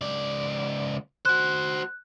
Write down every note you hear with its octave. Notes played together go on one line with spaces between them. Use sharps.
C#2 D5
F#4 C5 F#6